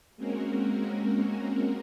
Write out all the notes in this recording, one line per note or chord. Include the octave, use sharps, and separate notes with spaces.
G#3 A#3 C4 C#4 F#4 A#4